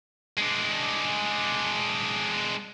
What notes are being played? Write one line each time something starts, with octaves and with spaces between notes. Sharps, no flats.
G#3 D4